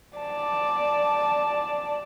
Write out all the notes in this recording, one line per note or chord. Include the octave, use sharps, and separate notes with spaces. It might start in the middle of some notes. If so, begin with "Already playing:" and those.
D5 A5